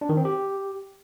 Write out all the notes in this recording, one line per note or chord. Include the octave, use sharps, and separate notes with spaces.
D4
D#3
C4
G4